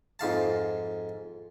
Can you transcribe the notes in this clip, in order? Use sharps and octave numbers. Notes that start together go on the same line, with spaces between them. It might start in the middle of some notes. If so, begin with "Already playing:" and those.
F2 G#2 F5 A5